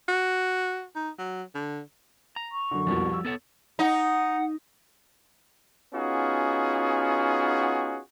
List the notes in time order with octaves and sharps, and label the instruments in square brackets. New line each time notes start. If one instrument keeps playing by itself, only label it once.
[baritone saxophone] F#4
D#4
F#3
D3
[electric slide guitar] A#5
[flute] C#6
[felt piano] F#2 D3
[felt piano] C2 F2 B2 [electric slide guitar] F3 G3 F#4
[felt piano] E6
[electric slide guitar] B3 A4 C#5
[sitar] D#4 [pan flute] F#5
[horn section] B3 C#4 D#4 F4 F#4 G#4